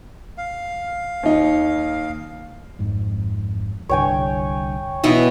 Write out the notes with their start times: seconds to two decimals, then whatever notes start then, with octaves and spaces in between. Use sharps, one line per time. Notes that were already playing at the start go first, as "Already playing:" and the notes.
0.37 F5
1.23 D#2 D#4
2.79 G#1 F2 G#2
3.89 C2 G2 D3 C#5 G5 G#5
5.04 B2 E3 F#5